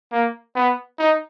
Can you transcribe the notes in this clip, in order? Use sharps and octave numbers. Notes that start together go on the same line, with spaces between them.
A#3
B3
D#4